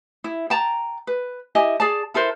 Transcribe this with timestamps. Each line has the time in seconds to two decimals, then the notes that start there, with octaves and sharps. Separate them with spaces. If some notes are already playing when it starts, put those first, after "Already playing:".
0.24 E4
0.50 G5 A5 A#5
1.07 B4
1.55 E4 G4 D#5 G#5
1.80 G#4 D5 A5
2.14 E4 A4 A#4 C5